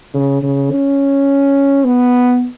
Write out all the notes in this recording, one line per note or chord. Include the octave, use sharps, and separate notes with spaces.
C#3
C#3
C#4
B3